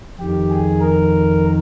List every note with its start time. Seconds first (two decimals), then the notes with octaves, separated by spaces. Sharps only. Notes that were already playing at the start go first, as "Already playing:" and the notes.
0.19 F2 D#3 G4
0.50 G#4
0.81 A#4